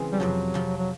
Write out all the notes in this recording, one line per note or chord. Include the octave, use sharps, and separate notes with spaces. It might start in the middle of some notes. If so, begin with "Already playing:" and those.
Already playing: C#3 E3 G#3 C4
G3
F2 C3 F3 F#3
F2 C3 F3
F#3